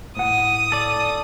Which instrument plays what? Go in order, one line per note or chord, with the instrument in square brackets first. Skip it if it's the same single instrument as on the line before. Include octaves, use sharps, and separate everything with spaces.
[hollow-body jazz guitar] A2 F#5 [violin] D#6
[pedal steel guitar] A4 D5